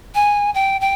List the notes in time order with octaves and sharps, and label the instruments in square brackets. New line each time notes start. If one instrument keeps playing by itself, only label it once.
[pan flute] G#5
G5
G5